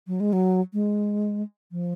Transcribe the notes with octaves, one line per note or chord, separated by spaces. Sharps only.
F#3
G#3
F#3
G#3
F3